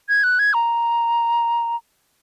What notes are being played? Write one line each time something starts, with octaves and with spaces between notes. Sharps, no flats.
G#6
F#6
G#6
A#5